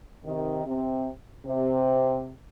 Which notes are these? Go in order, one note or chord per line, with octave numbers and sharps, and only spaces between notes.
C3 D#3
C3
C3